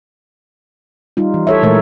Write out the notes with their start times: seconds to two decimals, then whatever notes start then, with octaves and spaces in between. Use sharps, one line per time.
1.17 G3 D#4 F4
1.34 E3
1.47 A4 C#5 E5
1.63 A#2 E3 G#3 A3 A#4 C#5